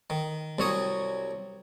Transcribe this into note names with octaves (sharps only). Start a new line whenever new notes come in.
D#3
C2 F#3 C#5 D#6